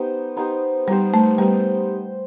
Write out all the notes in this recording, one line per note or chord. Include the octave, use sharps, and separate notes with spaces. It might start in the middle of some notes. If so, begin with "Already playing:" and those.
Already playing: B3 D#4 G4 C5
B3 D#4 G4 C5
G3 B3 D#4 G4 C5
A3
G3 B3 D#4 G4 C5